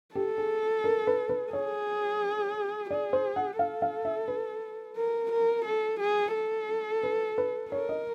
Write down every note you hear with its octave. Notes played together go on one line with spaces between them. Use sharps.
G4 A4
G#4
A#4
B4
B4
G#4 C#5
G#4 D5
C5
F#5
A4 F5
F5
E5
B4
A#4
A#4
A4
G#4
A4
B4
B4
A#4 C#5
D#5